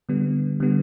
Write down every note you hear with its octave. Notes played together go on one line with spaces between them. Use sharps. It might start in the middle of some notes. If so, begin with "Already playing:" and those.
D3 G3 B3
D3 G3 B3